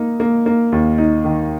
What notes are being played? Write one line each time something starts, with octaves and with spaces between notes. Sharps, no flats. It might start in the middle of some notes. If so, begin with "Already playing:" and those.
Already playing: A#3 D#4
A#3
A#3
D#2
D#4
D#3